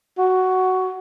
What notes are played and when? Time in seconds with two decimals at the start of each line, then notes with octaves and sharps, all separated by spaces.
0.18 F#4